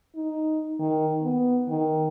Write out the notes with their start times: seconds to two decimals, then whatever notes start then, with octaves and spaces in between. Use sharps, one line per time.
0.15 D#4
0.79 D#3
1.22 B3
1.69 D#3